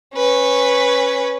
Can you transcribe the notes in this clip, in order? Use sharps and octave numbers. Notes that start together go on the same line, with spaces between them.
C#4 B4